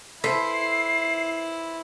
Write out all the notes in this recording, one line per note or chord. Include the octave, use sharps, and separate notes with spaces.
E4 A4 B4 C5 C7